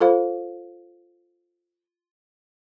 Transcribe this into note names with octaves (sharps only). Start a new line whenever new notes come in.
F4 A4 C5 F5